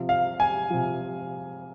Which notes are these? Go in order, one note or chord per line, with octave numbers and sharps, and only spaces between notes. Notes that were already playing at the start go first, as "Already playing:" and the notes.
Already playing: C3 F3
F5
G#5
C3 F3